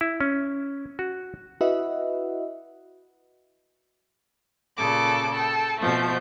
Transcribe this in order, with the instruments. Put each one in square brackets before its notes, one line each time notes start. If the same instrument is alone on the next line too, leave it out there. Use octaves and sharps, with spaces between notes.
[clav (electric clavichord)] E4
C#4
F#4
[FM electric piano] E4 F#4 B4 D#5 E5 F#5
[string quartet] A#2 C#3 A4 D6
A4 G5
B2 F3 A3 G6